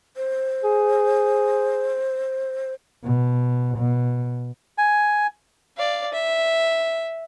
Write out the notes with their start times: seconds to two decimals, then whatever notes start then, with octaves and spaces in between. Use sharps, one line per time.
0.17 C5
0.64 G#4
3.04 B2
3.78 B2
4.78 G#5
5.77 D5 F5
6.12 E5